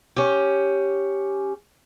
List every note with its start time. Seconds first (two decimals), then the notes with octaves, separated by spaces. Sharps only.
0.17 C#4 G4